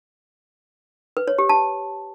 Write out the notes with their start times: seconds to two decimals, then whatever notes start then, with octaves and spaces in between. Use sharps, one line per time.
1.17 B4
1.28 C#5
1.38 G4
1.49 A5